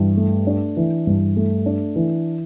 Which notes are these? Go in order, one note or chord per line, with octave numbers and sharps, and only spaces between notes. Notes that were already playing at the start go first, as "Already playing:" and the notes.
Already playing: G2 E3
A3
D4
E3
G2
A3
D4
E3